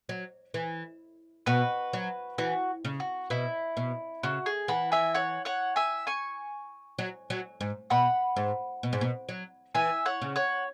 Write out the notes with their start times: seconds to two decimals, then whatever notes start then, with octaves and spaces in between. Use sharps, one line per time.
0.09 F#3
0.54 E3
1.46 B2 F#4 B4
1.93 F#3
2.38 E3 F#4
2.85 C#3
3.00 F#4
3.30 B2 E4
3.77 B2
4.23 C#3 F#4
4.46 G#4
4.68 E3 F#5 B5
4.92 E5 G#5
5.14 C#5 F#5
5.45 C#5 F#5
5.76 E5 G#5
6.07 G#5 C#6
6.99 F#3
7.30 F#3
7.61 G#2
7.90 B2 F#5 B5
8.36 G#2
8.83 B2
8.93 G#2
9.01 B2
9.29 F#3
9.75 E3 E5 G#5
10.06 C#5 F#5
10.22 C#3
10.36 C#5 F#5